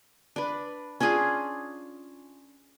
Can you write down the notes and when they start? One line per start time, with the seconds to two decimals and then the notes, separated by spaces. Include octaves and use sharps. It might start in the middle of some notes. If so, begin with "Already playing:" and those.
0.36 D4 B4
1.00 C#4 D4 F4 G#4